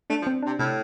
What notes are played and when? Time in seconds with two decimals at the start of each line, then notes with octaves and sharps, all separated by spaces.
0.10 A3 D4
0.22 F3
0.27 C4
0.43 C3 D4
0.59 A2 C3